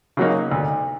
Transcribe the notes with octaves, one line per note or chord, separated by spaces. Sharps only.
C#3 F#3 A#3 D#4
D2